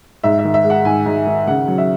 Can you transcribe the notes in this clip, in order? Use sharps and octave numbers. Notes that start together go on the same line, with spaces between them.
G#2 E5
E5
D#3
E5
G#3
F#5
G#2 G#5
G#2
D#3
C#3 F#5
F#3
E5